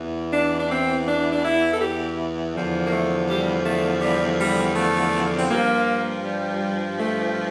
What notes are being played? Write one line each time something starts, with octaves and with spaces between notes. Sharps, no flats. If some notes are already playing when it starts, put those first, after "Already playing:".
Already playing: E2 E3
D4
D4
C4
D4
D4
E4
A4
G4
E2 D3 F3
A#3
A3
G3
A3
G3
G3
A3
C4
G2 F3 A#3
G3
A3